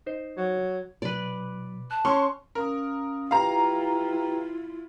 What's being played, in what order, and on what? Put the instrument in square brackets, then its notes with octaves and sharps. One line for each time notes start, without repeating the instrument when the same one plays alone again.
[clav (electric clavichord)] D#4 C5
[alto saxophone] F#3
[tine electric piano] B2 F#3 [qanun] B4 D5
[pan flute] A5 [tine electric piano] F#6
[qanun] C#4 [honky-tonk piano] C6 C#6
[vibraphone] C#4 F5 D#6 [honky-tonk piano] A#4
[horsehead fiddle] E4 F4 [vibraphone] G4 B4 G5 [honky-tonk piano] F5 A#5